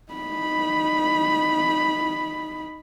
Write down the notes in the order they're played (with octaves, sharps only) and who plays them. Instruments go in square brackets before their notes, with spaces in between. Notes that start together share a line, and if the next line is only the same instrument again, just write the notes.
[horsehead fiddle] D#4 B5